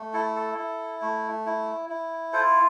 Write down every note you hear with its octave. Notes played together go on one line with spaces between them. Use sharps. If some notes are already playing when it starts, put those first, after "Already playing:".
Already playing: A3
E4 A4
A4
E4
A3
E4
E4
F4 A4 C5